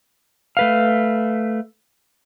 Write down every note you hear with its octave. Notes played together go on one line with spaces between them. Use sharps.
A3 B4 F5